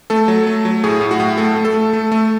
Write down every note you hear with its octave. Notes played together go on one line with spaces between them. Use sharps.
A3 A4
F#3
A3
F#3
A2 G#4
A2
F#4
A2
A3 A4
A3
A4
A3
A3
A3